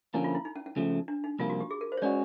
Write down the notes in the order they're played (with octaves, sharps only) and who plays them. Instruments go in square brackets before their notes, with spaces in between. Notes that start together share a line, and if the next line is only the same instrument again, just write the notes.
[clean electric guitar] D3 F3 A#3 C#4 [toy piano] E4
[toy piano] F4
E4
D#4
C#4
C#4
[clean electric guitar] C#3 F3 A3
[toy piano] D4
D#4
[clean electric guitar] C2 C3 F3 A#3 [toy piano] F4
[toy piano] F#4
G4
G#4
A#4
C5
C#5
[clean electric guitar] G#3 C#4 F#4 [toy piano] D5